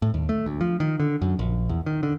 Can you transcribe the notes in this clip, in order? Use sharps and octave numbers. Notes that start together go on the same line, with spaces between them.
A2
D#2
A3
D2
F3
D#3
D3
F#2
A#1
E2
D#3
D3